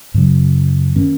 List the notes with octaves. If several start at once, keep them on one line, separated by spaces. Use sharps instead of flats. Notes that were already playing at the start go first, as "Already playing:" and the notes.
F#2 C#3 F#3
D#3 A#3 C#4